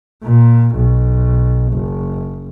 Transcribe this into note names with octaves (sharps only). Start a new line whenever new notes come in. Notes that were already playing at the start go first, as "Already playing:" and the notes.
A#2
B1
F#1